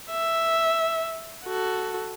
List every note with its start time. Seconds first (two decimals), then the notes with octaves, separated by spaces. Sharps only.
0.11 E5
1.44 F#4 A4